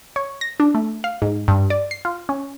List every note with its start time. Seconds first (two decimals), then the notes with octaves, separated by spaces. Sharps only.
0.16 C#5
0.41 A#6
0.60 D4
0.75 A3
1.04 F5
1.22 G#2
1.48 G2
1.70 D5
1.91 C7
2.05 F4
2.29 C#4